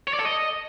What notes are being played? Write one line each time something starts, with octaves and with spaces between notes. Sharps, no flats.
C#5
D5
A4
D#5